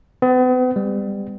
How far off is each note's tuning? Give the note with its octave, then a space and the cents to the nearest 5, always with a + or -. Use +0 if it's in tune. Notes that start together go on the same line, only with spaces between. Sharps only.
B3 +45
G3 +25